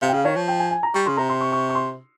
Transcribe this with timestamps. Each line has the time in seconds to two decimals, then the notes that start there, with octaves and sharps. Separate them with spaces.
0.02 C3 F5
0.09 G5
0.13 C#3 F5
0.25 D#3 C#5
0.36 F3
0.48 G5
0.59 G#5
0.71 G#5
0.83 A#5
0.94 G3 C#6
1.06 C#3 C6
1.17 C3 A#5
1.29 C6
1.41 C#6
1.52 C#6
1.69 C#6
1.75 C6